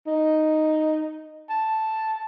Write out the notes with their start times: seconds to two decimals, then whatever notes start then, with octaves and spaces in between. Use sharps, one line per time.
0.07 D#4
1.50 A5